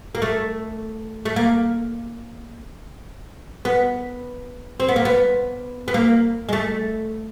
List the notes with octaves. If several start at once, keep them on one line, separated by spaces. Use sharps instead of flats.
A#3
A3
A3
A#3
B3
C4
B3
A#3
B3
B3
A#3
G#3
A3